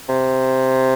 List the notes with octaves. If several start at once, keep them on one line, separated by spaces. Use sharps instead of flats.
C3